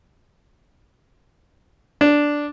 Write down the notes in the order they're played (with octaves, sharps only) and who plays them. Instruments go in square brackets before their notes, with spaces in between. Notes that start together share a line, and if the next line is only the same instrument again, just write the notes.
[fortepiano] D4